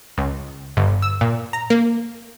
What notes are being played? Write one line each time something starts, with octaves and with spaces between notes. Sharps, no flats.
C#2
G1
E6
A#2
A#5
A#3